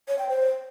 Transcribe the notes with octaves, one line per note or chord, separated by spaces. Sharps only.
C#5
G5
C5